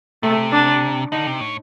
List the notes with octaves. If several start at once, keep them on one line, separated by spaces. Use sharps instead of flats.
C3 A3
D4
D3 D#4
C3
A2